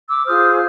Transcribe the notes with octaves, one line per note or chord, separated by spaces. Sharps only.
D6 E6
F4 G#4 C5 D#6 F6